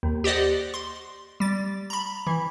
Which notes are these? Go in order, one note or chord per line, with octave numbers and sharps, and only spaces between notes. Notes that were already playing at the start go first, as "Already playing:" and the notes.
D#2
G4 C5 D5 D#5 F#5
C6
G3 A6
A#5 B5
E3